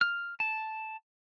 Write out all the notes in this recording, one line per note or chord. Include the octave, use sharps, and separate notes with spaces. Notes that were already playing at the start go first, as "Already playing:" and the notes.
F6
A5